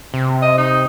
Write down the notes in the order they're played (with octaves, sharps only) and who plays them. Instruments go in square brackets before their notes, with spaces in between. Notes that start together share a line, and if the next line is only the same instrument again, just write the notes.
[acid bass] C3
[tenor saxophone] D#5
D#4